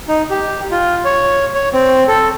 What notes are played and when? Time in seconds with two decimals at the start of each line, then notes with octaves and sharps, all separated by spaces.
0.08 D#4
0.30 G4
0.71 F4
1.05 C#5
1.54 C#5
1.73 C4
2.08 A4